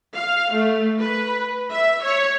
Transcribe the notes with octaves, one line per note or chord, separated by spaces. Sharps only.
F5
A3
B4
E5
C#5